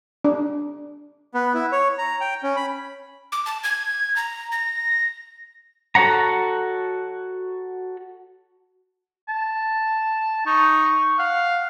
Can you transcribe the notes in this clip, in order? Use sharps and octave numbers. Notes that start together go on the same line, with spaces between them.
D4
B3
E4
C#5
A#5
G5
C#4
B5
D6
A5
G#6
A#5
A#6
F#4 A4 C#5 F#5 A#5
A5
D#4 C#6
F5 F#5